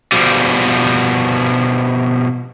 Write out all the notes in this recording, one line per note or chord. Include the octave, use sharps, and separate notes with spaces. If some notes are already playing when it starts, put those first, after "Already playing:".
B2 F3 G3